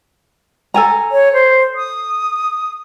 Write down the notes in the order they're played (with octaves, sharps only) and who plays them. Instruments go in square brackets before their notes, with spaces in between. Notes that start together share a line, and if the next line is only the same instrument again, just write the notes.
[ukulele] A4 G#5 A#5
[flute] C#5
C5
D#6